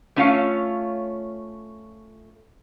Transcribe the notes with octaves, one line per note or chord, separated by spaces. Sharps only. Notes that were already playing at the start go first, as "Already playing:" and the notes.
A3 C#4 F4 C#5 F5